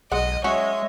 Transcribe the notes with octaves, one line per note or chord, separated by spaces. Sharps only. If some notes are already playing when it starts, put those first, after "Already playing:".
B1 G#3 D#5 F#5
F#3 G#3 C#4 F#4 C#5 D#5 E5